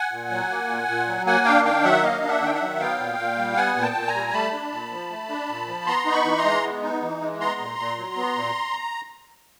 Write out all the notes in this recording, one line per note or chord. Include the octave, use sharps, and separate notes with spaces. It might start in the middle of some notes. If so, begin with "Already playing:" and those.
Already playing: F#5 G#5
A#2
F#3
A#3
A#2
A#2
F#3
A#3 F#5 G#5
D4 F5 G5
D#3 F5 G5
F#3 E5 F#5
A#3 D#5 F5
D4
E5 F#5
D#3 G5
E5 F#5
F#3
B3 F5 G5
A#2
A#2
G3
B3 F#5 G#5
A#2
G5 A5
A#2
G#5 A#5
G3
A3 A5 B5
D4
A#2
F3
A3
D4
A#2
F3
B3 A#5 C6
D#4
B5 C#6
E3
A#5 C6
G#3
B3
D#4
E3
G#3
B3 A#5 C6
A#2
A#2
F#3
B3
A#2